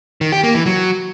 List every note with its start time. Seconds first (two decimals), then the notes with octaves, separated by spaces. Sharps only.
0.21 D#3
0.32 G4
0.43 A#3
0.55 E3
0.66 F#3